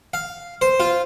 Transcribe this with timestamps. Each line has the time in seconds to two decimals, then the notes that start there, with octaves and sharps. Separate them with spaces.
0.14 F5
0.61 C5
0.80 F4